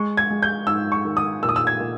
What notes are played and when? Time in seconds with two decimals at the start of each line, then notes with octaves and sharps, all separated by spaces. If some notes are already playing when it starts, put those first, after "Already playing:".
Already playing: G#3 C#6
0.17 G#6
0.30 G#3
0.42 G6
0.67 G#2 E6
0.92 C#6
1.05 D#3
1.17 D#6
1.43 A#2 E6
1.49 D#6
1.56 E6
1.67 G#6
1.80 A#2